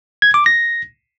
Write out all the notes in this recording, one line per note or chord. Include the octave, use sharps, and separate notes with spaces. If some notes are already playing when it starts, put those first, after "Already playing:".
G#6
D6
A#6